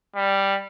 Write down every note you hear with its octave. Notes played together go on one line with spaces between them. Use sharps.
G3